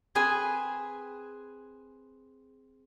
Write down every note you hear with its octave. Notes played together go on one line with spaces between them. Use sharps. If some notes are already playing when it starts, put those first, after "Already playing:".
C4 G#4 B4 G#5 B5